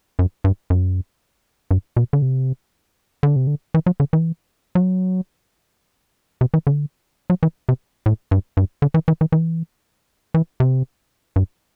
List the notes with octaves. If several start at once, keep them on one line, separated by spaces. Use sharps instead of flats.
F#2
G2
F#2
G2
B2
D3
C3
D3
C3
D3
E3
F#3
D3
E3
F#3
C3
E3
D3
F#3
E3
C3
A2
G2
G2
D3
E3
E3
E3
E3
E3
C3
G2